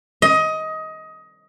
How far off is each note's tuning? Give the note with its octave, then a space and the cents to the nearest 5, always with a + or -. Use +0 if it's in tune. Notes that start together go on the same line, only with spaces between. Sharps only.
D#5 +20